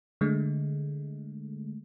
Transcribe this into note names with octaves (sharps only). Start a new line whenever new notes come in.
D3 G#3 A3